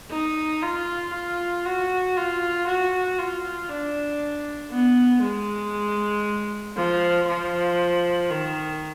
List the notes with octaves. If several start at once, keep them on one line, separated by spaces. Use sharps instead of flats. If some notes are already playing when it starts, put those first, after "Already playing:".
D#4
F4
F4
F#4
F4
F#4
F4
D4
B3
G#3
F3
F3
D#3